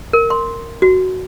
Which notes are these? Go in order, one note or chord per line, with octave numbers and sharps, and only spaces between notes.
A#4
C6
F#4